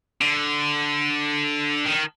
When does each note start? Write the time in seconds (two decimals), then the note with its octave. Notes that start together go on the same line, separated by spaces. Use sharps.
0.21 D3
1.86 D#3